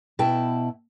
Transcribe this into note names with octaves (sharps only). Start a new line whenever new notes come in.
B2 E4 G5 A5